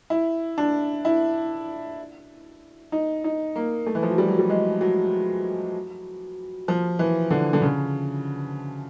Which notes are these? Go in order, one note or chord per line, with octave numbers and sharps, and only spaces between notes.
E4
D4
E4
D#4
D#4
A#3
A3
E3
F3
F#3
G3
F#3
G3
G#3
F#3
F3
E3
D3
D3
C#3